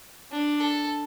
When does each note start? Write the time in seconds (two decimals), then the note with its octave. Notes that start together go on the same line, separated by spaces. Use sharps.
0.32 D4
0.60 A4